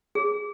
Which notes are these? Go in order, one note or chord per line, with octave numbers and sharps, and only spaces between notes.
G#4